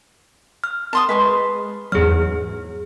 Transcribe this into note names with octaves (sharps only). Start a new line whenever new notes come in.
F6
A5 C6 D#6
G#3 B4 C6 C#6
E2 G#2 F#3 G#4 F6